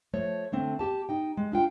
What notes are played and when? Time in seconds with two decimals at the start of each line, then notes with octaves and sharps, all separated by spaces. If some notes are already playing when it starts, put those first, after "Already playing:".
0.13 F3 A3 C#5
0.52 D3 A3 C4
0.79 G4 A5
1.09 D#4 G5
1.37 G#3
1.52 D4 F4 G5